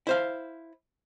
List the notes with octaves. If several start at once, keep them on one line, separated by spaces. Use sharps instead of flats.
E4 C5 F5